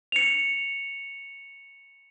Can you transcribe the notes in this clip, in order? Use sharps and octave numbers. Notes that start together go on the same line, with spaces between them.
C#7 F7